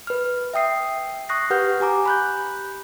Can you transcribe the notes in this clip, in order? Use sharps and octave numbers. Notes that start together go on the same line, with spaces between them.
B4 F6
E5 G5 D#6 C7
C#6 D#6 F#6 A#6 C7
G4 B4 F#5 F6 G6
G4 G#5 A#5 D6
B5 F#6 G6